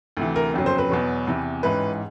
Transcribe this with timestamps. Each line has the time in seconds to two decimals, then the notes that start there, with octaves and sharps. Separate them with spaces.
0.17 D2 C3 E3
0.36 A#4
0.54 G1 F2 C#3 F#3
0.66 C5
0.78 B4
0.90 E2 B2 F#3
1.27 E2 C3 E3
1.63 A1 G#2 E3 B4